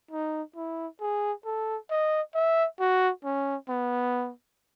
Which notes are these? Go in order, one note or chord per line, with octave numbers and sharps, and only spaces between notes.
D#4
E4
G#4
A4
D#5
E5
F#4
C#4
B3